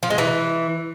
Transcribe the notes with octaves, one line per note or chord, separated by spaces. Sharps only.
F3
G#3
E3